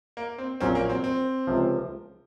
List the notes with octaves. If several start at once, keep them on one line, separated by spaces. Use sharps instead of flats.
A#3
C4
A#1 A#2 F#3 C4 C#4
A#3
C4
C4
C#2 C3 F3